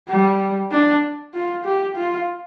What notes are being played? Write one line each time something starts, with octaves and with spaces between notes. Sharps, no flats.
G3
D4
F4
G4
F4